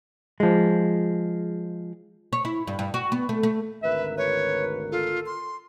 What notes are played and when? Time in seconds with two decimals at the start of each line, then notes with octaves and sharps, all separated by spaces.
0.40 F3 G#3
2.33 C#5
2.45 E4
2.67 G2
2.79 G2
2.94 F#4
3.12 B3
3.29 A3
3.43 A3
3.83 G#1 D2 A#4 B4 E5
4.17 B4 C#5
4.92 F4 A4
5.26 C6